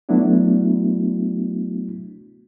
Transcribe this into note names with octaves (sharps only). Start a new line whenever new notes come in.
F#3 A3 B3 D4 E4 F#4